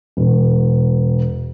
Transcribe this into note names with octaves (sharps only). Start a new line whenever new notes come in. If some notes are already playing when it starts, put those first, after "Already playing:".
E1